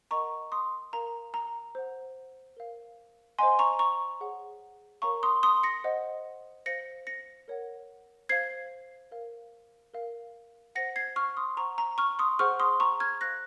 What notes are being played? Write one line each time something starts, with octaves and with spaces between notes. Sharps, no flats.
A#4 D#5 F#5 A#5 C#6
C6 D#6
A#4 F5 A#5
A#5
C5 F#5
A#4 F5
C5 D#5 F#5 G#5 C6
A#5 C#6
A#5 C#6
G#4 C#5 F#5
A#4 C#5 F5 A#5 C#6
C6 D#6
C6 D#6
A#6 C#7
C5 D#5 F#5
C5 F5 A#6 C#7
A#6 C#7
A#4 C#5 F#5
C5 F5 G#6 C7
A#4 F5
A#4 F5
C5 F#5 A#6 C#7
G#6 C7
C#6 F6
C6 D#6
C5 F#5 A#5 C#6
A#5
C#6 F6
C6 D#6
G#4 C5 F#5 C#6 F6
C6 D#6
A#5 C#6
F6 G#6
C5 F5 F#6 A#6